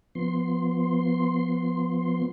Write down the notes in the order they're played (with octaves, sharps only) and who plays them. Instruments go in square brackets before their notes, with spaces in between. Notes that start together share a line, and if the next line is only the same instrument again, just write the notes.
[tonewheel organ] F3 B3 C6